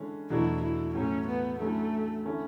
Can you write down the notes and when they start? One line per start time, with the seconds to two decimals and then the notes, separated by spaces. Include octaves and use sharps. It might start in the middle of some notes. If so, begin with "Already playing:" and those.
Already playing: D3 G#3 C#4 E4
0.30 E2 B2 F#3 A3 D4 E4
0.63 E4
0.95 A2 F#3 A3 C#4
1.28 B3
1.60 D3 F#3 A3 C#4 E4
2.25 D3 A3 C#4 E4